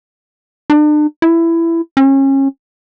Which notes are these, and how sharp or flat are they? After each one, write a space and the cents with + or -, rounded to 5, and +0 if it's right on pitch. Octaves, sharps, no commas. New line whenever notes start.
D4 +40
E4 +15
C#4 -30